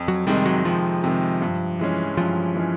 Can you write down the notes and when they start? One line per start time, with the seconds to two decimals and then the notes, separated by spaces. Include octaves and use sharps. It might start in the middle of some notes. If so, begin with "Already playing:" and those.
Already playing: F2
0.08 F#3
0.26 C3 D#3 G3 G#3
0.46 F#3
0.65 F2 F3
1.04 C3 D#3 G#3
1.42 G2
1.79 E3 G#3 C#4
2.17 G2 F3
2.55 E3 G#3 C#4